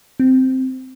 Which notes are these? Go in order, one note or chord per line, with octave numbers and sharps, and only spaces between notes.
C4